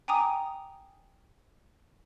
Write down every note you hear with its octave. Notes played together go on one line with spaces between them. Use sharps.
G5 G#5 A#5 D6 D#6